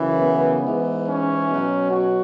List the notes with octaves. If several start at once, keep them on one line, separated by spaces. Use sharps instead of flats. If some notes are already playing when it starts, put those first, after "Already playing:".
Already playing: F#2 C#3 E3
B3
G#2 E3
C#4
B2 F#3
F#4